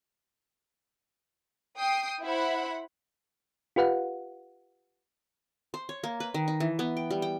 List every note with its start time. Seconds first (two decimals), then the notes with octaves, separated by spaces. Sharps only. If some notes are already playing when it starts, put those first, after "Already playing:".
1.77 G5 D#6 C7
2.21 E4 C5 F#5 B5
3.76 F4 G4 B4 F5 F#5
5.74 C5
5.89 C#5
6.04 A#3
6.20 B4
6.34 D#3
6.48 D#4
6.60 E3
6.79 B3
6.97 G5
7.11 G3
7.22 G5